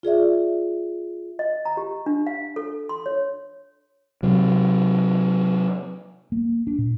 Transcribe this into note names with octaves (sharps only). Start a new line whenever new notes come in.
F4 G#4 D5 E5
D#5
A#5
G4
D4
F5
A4
C6
C#5
C3 F#3
A#3
D4
A#2